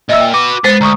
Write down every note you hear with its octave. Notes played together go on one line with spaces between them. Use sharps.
A#2 D#5 E5 E6
G5
F#4 B4 D6
G#3 B3 C5 A6
D2 A#5 C#6 D#6